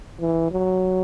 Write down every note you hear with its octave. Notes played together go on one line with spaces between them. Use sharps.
E3
F#3